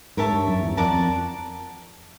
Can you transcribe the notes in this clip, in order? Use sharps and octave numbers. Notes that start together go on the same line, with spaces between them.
G#2 A#4 C#5 E5 A5
G2
F#2
E2
F2 A#4 D5 F#5 A5
F2